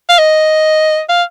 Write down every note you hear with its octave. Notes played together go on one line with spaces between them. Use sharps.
F5
D#5
F5